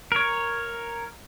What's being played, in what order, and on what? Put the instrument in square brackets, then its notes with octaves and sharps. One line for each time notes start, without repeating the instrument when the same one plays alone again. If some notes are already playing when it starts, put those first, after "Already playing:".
[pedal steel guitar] A#4 C#5